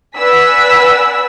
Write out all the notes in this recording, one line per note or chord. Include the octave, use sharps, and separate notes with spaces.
B4 D5 F#5 G#5 E6 B6